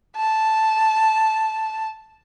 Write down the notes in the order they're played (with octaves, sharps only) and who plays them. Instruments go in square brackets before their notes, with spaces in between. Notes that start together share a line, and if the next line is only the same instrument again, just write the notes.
[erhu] A5